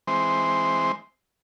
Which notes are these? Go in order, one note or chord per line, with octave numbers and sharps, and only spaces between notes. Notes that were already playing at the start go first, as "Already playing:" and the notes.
E3 G#3 C4 C5